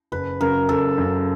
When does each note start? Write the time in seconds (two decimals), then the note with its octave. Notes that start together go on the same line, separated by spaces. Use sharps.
0.12 F#1 B4
0.41 F#2 C#3 A#4
0.69 F#1 A4
0.98 F#2 C#3